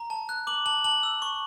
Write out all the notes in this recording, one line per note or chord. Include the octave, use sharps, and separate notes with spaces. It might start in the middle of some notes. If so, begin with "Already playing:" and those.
Already playing: A#5
A5
F#6
D6 F#7
A5 F#7
A5 F#7
E6
C#6